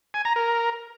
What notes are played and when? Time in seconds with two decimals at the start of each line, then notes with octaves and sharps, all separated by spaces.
0.14 G#5
0.25 A#5
0.36 A#4